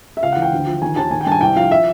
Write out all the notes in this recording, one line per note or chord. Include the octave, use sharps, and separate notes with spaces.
E5
C#2 F5
F#5
E3
G5
D2
F3
D#3 G#5
D#2 A5
D#3 G#5
G5
G2 A5
G#5
C2 G5
F3 F5
E5